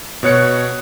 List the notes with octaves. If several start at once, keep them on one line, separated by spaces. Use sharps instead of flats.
B2 C#5 F#6 C#7